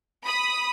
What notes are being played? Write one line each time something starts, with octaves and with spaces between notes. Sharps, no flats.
B5 D#6